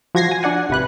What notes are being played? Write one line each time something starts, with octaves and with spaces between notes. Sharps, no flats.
F3 F#4 G#6 A#6 C7
G#5
D4 D5 F#5 G#5
G#1 C3 B4 F#6